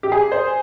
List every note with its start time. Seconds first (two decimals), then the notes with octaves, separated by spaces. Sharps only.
0.03 G4
0.12 G#4
0.32 C5